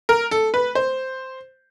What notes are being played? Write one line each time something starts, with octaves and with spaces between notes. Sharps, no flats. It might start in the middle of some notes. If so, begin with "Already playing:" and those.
A#4
A4
B4
C5